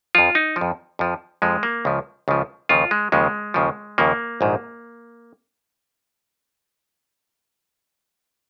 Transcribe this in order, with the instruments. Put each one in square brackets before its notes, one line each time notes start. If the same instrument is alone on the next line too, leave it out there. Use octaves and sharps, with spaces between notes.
[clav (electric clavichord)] F2 F3 F4
D#4
F3
F2
F2 F3
F2 F3 G#3
A#3
C#2 C#3 F3
C#2 C#3 F3
D#2 C#3 F3 F4
G#3
D#2 C#3 F3 G#3
D#2 C#3 F3
D#2 C#3 F3 A#3
A#1 G#2 D#3